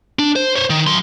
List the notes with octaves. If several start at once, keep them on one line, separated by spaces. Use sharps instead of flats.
D4
C5
C5 C#5
D#3
F#3 C6